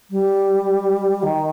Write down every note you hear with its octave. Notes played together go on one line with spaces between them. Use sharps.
G3
D#3